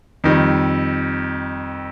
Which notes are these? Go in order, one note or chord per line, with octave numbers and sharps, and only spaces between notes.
F2 D#3 G3